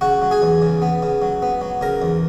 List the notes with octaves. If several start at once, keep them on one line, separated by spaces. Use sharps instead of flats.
C#3 F#4 F#5
F#3
G#4 G#5
E2
C#3
B3
C#3
F#3
B3
F#3
C#3 A#4 A#5
E2